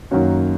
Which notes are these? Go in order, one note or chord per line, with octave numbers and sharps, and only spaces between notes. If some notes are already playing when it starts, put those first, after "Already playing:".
F#2 D#3 A#3 C#4 F#4